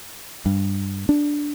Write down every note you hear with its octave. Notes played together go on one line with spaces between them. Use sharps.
G2
D4